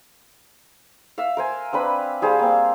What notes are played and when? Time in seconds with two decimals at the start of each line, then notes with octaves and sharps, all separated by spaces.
1.18 E5 F5
1.37 A#4 C5 G#5
1.73 C4 D4 B4 B5
2.22 G3 G#4 C5 F5
2.39 A#3 C4